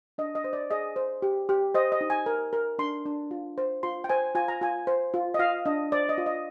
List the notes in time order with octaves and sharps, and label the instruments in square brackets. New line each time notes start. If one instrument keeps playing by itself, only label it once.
[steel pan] D4 D#5
D#5
C5
D5
G#4 D#5
C5
G4
G4
C5 D#5
D#5
D#4
G#5
A#4
A#4
D4 C6
D4
F4
C5
F4 C6
G5
C5 G#5
F4 G#5
A#5
F4 G#5
C5
F4
D#5
F4 F5
D4 D#5
C5 D5
D#5
F4
D#5